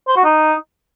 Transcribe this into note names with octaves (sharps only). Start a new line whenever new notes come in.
C5
F#4
D#4